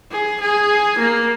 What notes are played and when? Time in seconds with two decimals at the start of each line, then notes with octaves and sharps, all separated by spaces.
0.11 G#4
0.40 G#4
0.99 A#3